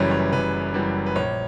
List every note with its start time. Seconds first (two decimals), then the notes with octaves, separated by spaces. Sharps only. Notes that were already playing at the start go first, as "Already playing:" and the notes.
Already playing: F#1 F#2 E3 G3 B4 C#5
0.11 C#5
0.33 F#1 B4
0.74 F#2 E3 G3
1.06 B4
1.15 A#1 C#5